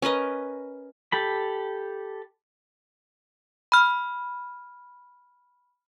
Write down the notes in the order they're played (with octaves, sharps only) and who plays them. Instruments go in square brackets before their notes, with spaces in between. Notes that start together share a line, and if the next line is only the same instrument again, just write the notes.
[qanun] C#4 A#4 B4 D#5
[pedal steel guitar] G4 A4 B5
[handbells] B5 F6